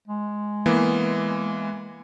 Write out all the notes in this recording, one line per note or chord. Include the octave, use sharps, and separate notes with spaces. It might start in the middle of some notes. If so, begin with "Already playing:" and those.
G#3
E3 A#3 B3